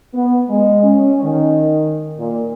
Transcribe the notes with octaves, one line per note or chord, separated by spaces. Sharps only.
B3
G#3
C#4
D#3
A#2